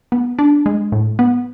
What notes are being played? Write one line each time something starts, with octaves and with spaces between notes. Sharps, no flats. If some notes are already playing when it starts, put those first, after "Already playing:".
B3
D4
G#3
A2
B3